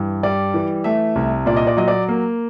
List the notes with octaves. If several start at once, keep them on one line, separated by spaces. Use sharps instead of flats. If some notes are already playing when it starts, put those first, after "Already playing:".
Already playing: G2 E3
G3 D5
E3
A3 E5
C2
A#2 D5
D#5
D5
F#3 D#5
D5
A#3